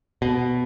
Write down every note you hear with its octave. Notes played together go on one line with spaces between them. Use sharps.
B2